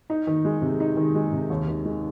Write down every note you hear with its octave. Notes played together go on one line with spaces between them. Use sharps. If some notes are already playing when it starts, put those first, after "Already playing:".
D#4
D#3
G#3
C3
D#4
D#3
G#3
C3
D#2
D#3
G#3